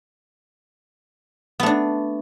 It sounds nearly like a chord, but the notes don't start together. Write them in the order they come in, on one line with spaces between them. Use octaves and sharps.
B3 A3 D4